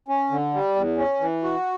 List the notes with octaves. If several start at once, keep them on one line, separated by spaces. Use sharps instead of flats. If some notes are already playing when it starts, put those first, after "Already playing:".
C#4
D3
G3
E2
C#4
E3
F#4